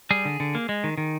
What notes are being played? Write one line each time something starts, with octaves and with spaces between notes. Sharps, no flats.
G3 G#4
D3
D3
A#3
G#3
D#3
D#3